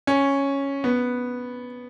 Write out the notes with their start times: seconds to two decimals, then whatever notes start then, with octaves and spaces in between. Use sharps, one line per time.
0.07 C#4
0.84 B3